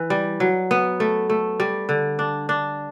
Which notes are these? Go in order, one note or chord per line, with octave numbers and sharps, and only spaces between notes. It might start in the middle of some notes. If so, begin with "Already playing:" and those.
Already playing: E3
G3
F#3
B3
A3
A3
G3
D3
D4
D4